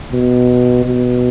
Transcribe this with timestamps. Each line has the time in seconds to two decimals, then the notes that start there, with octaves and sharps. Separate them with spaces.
0.12 B2
0.85 B2